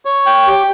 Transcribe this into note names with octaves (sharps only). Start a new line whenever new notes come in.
C#5
G5
G4